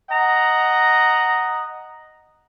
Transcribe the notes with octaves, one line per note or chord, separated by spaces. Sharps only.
D#5 F#5 A#5